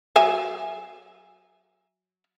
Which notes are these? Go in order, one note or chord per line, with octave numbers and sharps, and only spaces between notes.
F#3 E5 G#5